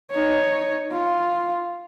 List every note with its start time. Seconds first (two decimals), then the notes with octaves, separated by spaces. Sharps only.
0.11 D#4 C#5
0.91 F4